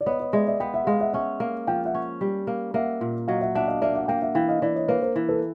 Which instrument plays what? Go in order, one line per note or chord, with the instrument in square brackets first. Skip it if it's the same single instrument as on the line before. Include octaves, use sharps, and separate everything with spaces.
[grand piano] D5
[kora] B3 [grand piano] C#5 D#5
[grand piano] C#5 D#5
[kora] G#3 [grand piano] D5 E5
[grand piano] D5 E5
[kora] B3 [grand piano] F5 G5
[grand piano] E5 F#5
[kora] G#3 [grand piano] D#5 F5
[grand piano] E5 F#5
[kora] C#4 [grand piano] E5 F#5
[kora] A#3
[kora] F3 [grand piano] F5 G5
[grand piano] E5 F#5
[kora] C#4
G3
A#3
[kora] A#3 [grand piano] E5 F#5
[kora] A#2
[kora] F#3 [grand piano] D#5 F5
[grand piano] E5 F#5
[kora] D4 [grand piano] E5 F#5
[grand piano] D#5 F5
[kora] A#3 [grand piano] D5 E5
[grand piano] E5 F#5
[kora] A#3 [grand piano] F5 G5
[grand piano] E5 F#5
[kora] E3 [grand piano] F5 G5
[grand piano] D#5 F5
[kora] E3 [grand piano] D5 E5
[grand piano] C#5 D#5
[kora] A#3 [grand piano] B4 C#5
[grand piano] A#4 C5
[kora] E3
[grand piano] A4 B4